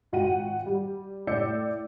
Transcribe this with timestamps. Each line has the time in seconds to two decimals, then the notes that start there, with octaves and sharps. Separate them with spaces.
0.12 G#1 F4 F#4 F#5 G5 D#7
0.66 G3
1.27 A2 D5 E6 G6 C#7